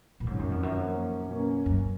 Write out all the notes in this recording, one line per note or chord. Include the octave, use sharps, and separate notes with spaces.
A#2
G#2 D#3 F#3 C#4
F#2
F2
F#2
F3 A#3 C#4
B2 A#3 C#4
F#2